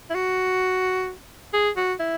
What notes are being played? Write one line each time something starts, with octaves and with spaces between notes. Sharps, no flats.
E4
F#4
G#4
F#4
E4